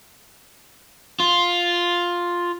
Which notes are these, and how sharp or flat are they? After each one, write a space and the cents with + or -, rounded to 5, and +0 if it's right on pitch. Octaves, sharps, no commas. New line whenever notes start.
F4 +5